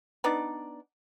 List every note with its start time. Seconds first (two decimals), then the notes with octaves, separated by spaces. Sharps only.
0.24 B3 D4 D#4 D5